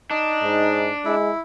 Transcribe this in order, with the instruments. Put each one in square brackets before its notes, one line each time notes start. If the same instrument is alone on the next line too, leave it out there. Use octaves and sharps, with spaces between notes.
[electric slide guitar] D4 [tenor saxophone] D#4
[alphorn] G#2
[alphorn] G#3 [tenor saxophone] E4